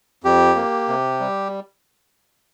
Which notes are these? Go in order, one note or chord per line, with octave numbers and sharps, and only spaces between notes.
F2 G4
A#3
C3
G3